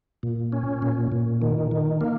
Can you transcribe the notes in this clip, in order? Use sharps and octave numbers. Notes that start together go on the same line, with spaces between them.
A#2
C#4
A#2
A#2
D#3
D#3
A#3